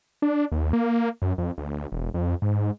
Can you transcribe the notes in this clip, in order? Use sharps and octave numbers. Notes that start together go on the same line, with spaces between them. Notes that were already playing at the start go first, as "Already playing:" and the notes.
D4
D#2
A#3
F#2
F2
D2
E1
F2
G#2